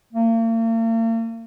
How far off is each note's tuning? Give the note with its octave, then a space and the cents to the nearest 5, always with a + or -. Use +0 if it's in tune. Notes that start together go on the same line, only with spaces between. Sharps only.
A#3 -45